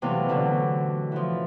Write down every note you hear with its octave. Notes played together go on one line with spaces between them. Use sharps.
E2 C3 E3 F#3 A3 F5
B2 D3 E3 F#3
E3 F3